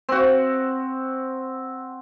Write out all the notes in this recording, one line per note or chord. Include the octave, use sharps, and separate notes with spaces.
C4 F#4